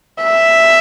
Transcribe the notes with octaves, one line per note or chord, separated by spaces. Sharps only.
E5